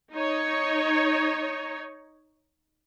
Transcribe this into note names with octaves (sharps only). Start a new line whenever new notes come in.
D#4 C#5